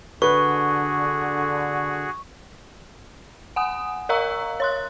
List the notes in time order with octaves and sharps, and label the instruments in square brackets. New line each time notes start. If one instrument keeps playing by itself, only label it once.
[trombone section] D3 [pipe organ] F#4 G#4 [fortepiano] B4 [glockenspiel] C#6
[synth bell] F#5 G#5 D#6
A#4 D#5 F5 A#5 C#6 E6
C#5 C6 F#6